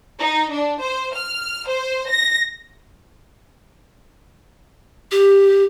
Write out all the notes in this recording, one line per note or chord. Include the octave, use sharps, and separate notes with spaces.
D#4
D4
C5
F6
C5
A#6
G4